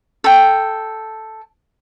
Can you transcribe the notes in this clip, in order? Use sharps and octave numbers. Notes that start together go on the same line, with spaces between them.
A4 G5